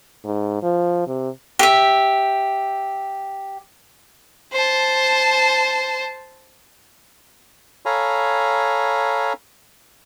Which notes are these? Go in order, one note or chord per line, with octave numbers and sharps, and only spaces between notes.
G#2
F3
C3
G4 E5
C5 A5
A4 C#5 F5 G#5 A#5 B5